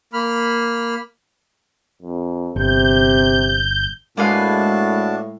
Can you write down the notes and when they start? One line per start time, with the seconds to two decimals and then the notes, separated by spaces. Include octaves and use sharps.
0.13 A#3 B5 F6
2.02 F2
2.56 G1 C3 G6
4.17 A2 G#3 A#3 D4 F#4 B4 F5 A5